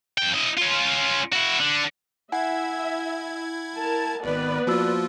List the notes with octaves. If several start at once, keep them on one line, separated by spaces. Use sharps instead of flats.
F2 G5
E4 D#5
C#4 F4
E4 F#4
D3
E4 E5 F#5 G#5 G#6
A#4 A5
G#1 D#3 B3 B4 D5
F3 A#3 F4 F#4 E6